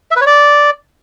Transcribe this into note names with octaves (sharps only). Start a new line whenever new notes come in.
E5
B4
C#5
D5